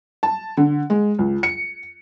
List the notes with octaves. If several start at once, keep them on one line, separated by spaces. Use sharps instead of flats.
A5
D3
G#3
C#2
C#7